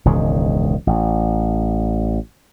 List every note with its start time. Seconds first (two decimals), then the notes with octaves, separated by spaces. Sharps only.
0.05 E1 C#2 G#2 D#3
0.87 A1